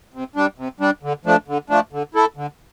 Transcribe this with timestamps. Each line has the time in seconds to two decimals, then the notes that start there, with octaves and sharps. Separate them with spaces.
0.14 C3
0.36 G3 D4
0.58 C3
0.80 G3 D4
1.03 D3
1.25 F3 A3 D4
1.48 D3
1.70 F3 A3 D4
1.93 D3
2.15 A3 E4 A4
2.37 D3